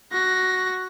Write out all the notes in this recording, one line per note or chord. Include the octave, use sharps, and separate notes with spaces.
F#4 A#6